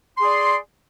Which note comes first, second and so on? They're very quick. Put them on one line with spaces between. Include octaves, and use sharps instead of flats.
C6 G#4 D5